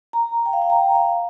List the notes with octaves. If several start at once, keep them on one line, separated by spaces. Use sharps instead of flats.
A#5
G5
F5
G5
A#5
F5